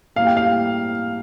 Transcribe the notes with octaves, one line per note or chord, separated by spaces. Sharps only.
A2 G3 A#3 F5
G5
F5